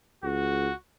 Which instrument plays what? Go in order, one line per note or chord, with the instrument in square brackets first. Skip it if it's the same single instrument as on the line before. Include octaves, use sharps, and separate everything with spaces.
[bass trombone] C#2 [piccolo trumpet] F#4